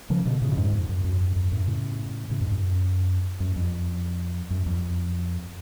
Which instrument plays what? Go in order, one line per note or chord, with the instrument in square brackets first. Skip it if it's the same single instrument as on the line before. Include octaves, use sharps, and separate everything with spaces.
[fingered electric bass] C#3 F3
B2 D3
A2 C#3
A2
F2 G#2
F2
F#2
F#2
F#2
F#2
F#2 A2
A2 C#3
A2 C#3
F2 G#2
F#2
F#2
F2
F#2
F2